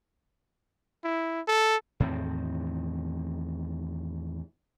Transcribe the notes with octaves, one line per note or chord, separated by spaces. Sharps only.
E4
A4
E2 A2 D#3 C4